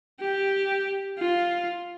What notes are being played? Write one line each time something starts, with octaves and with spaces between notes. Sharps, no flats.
G4
F4